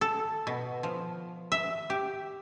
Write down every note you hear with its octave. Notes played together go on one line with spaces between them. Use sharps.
A4
B2
F3
E5
G4